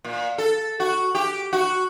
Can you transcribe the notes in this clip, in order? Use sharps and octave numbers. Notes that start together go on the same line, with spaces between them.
A#2
A4
F#4
G4
F#4